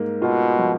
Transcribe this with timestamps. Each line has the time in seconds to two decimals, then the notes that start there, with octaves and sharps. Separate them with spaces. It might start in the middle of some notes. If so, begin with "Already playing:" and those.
Already playing: G#2 A#3
0.22 B2 F4
0.59 F3